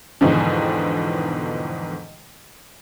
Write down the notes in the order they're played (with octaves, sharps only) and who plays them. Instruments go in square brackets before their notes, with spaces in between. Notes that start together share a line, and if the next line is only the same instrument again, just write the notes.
[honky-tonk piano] E2 G#2 B2 D3 D#3 F3